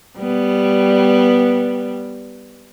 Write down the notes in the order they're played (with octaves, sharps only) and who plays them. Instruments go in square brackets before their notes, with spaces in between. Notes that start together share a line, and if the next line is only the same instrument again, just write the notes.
[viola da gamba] G3 B3